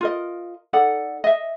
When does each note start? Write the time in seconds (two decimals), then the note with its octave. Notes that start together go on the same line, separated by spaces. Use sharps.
0.01 F4 A#4 D#5
0.73 D#4 A4 D5 F#5
1.24 D#5 E5